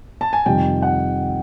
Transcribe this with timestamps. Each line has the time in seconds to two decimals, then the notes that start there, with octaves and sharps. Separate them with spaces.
0.21 A5
0.33 G#5
0.46 F2 C3 D#3 G3 G5
0.82 F#5